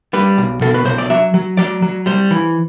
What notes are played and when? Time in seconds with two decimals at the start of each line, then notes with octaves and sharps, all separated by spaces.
0.13 G3 B4
0.38 B1
0.61 B2 A4
0.74 B4
0.85 B1 C5
0.98 D5
1.10 F#3 E5
1.34 F#3
1.57 F#3 D5
1.82 F#3
2.06 G3 C5
2.31 E3